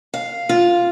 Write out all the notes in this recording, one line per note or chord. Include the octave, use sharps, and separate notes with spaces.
F5
F4